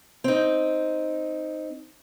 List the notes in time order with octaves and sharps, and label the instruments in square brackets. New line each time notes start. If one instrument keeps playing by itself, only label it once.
[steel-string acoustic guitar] C4 D#4